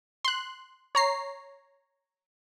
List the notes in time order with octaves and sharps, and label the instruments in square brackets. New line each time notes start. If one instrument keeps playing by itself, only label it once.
[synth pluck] C6 F#6
C#5 A#5 C7